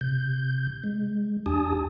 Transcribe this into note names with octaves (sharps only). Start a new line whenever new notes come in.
C3 G6
G#3
E2 D4 G4 G#5 A5 D#6